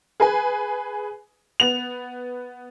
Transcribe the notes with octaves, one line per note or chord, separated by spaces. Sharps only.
G#4 B4 G#5
B3 F7